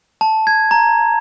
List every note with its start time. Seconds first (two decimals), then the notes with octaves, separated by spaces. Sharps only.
0.21 A5
0.47 G#6
0.71 A#5